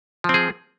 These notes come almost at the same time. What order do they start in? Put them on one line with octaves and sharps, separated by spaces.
F3 C4 G#4